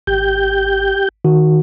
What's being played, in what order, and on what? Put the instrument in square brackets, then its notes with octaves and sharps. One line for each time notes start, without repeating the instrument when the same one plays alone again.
[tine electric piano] G#1 [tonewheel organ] G4 G6
[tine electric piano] D#3 F#4